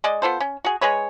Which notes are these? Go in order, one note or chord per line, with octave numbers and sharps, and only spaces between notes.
G#3 D5 D#5
B3 F4 A4 C5
C#4
F#4 G#4
G#3 G#4 B4 C#5